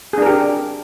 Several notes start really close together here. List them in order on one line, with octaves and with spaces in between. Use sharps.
G#4 D4 A#4 G4